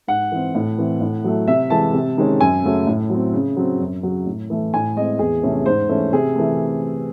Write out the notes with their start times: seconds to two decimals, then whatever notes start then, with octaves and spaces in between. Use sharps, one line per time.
0.07 G#2 F#5
0.32 E3 C4
0.55 A2
0.78 E3 C4
1.00 A2
1.24 F#3 A3
1.48 C3 E5
1.70 E3 G#3 A5
1.94 C3
2.17 D#3 G#3 C#4
2.41 F#2 G#5
2.63 C#3 F#3 A3 C#4
2.87 A2
3.10 F#3 C4
3.33 C#3
3.57 F#3 C4
3.80 F#2
4.03 C#3 F#3
4.26 A2
4.50 E3 A3
4.74 A2 G#5
4.96 G#3 C4 D#5
5.19 E2 G#4
5.43 C3 E3 A3 C#4
5.66 G#2 C5
5.89 E3 A3 C#4
6.13 C3 G#4
6.36 E3 A3